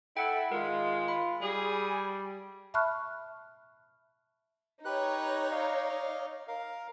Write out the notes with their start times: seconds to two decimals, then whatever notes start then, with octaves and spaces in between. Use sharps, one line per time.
0.17 E4 A4 F#5 G5
0.52 D#3 G#3 F4 A#4
1.08 B5
1.42 G3 G#4
2.74 E5 A5 B5 C#6 F6 F#6
4.85 D#4 G4 B4 C#5 F#6
5.51 D5 D#5 F5
6.48 A#4 F5